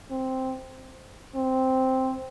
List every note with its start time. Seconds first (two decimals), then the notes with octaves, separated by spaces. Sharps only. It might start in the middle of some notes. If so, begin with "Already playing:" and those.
0.11 C4
1.35 C4